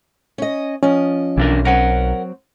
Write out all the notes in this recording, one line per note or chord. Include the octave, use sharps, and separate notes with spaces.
C#4 D#5
F3 C#4 D#5
B1 E3 D4 A#4
F#3 C4 A#4 F#5